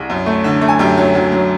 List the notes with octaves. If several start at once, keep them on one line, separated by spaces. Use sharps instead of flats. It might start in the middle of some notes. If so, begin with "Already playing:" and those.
Already playing: C2 G#4
F#2
A3
D3
A3
G#5
F#2 G4 G5
F#3
F#3
F#3